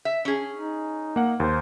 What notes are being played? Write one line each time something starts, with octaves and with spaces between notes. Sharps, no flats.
E5
C#4 G#4
D#4
A#3 F#5
D#2 C5